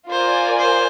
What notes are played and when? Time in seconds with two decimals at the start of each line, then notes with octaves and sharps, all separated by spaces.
0.10 F4 A#4 C5 D5 G#5
0.58 C5